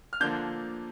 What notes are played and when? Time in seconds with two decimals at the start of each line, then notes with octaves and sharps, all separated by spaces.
0.13 F6
0.20 D3 F3 A#3 D4 G6